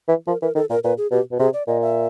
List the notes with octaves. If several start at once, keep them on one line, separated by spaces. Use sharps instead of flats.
E3
F3 A#4
E3 A#4
D#3 A4
A#2 A#4
A#2 B4
G#4
B2 G4
B2
C3 G#4
D5
A#2 D#5
E5